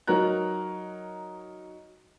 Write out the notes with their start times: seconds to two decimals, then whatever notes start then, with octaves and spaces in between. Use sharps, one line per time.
0.07 F#3 D#4 A#4 C#5 A#5 F#6